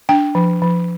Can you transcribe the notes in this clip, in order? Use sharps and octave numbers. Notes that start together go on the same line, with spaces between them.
D4 G5
F3
F3